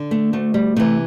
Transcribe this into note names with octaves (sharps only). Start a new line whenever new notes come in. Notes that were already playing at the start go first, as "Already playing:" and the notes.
Already playing: D3
A3
D2 A3
G3
C3 E3 A3